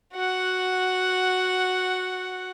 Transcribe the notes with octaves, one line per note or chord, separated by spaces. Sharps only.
F#4 F#5